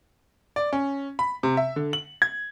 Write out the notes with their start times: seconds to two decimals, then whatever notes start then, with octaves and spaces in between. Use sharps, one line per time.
0.56 D5
0.73 C#4
1.19 B5
1.43 C3
1.57 E5
1.76 D3
1.93 F#7
2.22 G#6